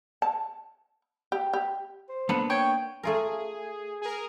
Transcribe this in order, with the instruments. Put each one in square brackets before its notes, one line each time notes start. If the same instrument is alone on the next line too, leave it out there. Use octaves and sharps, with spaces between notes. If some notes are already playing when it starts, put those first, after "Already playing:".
[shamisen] A5
G4
G4
[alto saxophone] C5
[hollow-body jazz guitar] A#3 B3 D4 [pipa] A4 B4
[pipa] C#5 [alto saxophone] G5
[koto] A3 F4 A#4 [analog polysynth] G#4
[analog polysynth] G#4 A#4